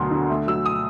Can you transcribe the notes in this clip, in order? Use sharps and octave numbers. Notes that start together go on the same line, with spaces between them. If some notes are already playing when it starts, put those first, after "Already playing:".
Already playing: D2 B2 F#3 A#3 C6
D3
A3
F#3 E6
D#6